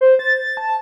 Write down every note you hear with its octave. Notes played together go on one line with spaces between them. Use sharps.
C5
A6
A5